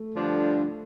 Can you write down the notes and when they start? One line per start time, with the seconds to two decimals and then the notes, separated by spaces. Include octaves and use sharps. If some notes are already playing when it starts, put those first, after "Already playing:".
Already playing: A3
0.14 G2 D3 F3 D4